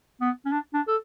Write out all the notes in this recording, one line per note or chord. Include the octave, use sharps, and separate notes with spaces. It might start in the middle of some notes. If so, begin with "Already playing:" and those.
B3
C#4
D4
D4
A4